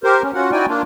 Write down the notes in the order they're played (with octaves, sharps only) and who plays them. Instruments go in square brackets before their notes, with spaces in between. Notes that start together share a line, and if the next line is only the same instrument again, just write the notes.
[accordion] G4 A#4 C5
C#4
C#4 F4 F#4 F#5
D#4 E4 F#4 D5 G5 G#5
A#3 D4 F4